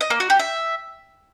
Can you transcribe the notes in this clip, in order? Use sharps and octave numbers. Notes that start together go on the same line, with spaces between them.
D#5
A#3
F#4
G4
E5